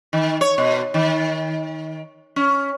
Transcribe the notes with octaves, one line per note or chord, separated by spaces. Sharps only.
D#3
C#5
B2
D#3
C#4